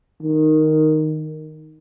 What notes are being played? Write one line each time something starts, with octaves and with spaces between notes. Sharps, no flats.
D#3